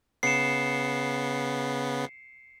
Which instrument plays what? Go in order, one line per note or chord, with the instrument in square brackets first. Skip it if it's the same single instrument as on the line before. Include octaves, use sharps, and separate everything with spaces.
[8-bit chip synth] C#3 B3 [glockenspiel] C7 C#7 E7